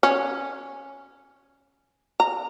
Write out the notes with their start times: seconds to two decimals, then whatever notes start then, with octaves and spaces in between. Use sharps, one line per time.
0.03 C#4
2.20 A#5